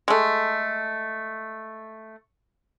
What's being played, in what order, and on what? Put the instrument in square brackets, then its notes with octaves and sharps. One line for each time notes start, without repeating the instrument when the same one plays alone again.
[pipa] G#3 A3